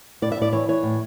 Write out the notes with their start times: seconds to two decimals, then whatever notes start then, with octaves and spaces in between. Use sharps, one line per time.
0.22 A2 D5
0.32 E5
0.37 A2 D5
0.53 E3 C#5
0.68 E3 C#5
0.83 A2